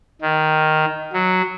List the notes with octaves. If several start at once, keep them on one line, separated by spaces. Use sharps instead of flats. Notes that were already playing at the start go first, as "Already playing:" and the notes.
D#3
F#3